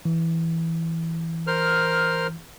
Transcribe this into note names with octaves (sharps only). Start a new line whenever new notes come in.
E3
A#4 C5 F6